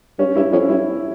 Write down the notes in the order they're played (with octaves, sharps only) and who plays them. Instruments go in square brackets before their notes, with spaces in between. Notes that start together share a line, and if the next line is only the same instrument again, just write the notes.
[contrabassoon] G2 [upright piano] C#4
[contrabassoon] G2 [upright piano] E4
[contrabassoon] F2 [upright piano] C#4
[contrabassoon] G2 [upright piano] E4